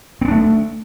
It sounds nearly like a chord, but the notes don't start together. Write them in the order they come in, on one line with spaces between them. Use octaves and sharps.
C4 B3 D4 A3